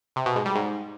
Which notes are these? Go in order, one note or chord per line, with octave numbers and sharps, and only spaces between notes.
C3
B2
G#2
G3
G#2